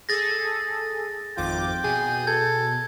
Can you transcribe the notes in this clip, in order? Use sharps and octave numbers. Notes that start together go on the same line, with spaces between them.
G#4 A4 A6 A#6
G#1 F2 F4 G5 D6
B2 G#4
A4 G#6